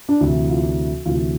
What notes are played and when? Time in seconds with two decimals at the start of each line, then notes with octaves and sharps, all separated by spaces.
0.09 D4
0.20 D2 C3 E3 E4
0.49 F4
1.06 D2 C3 E3 F4